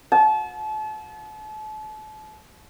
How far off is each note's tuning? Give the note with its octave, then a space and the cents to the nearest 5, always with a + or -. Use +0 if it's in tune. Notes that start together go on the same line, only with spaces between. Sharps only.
A5 -35